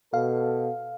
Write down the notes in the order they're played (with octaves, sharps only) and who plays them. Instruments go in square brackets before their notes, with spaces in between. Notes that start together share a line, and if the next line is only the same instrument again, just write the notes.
[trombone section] B2 A4 [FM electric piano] F5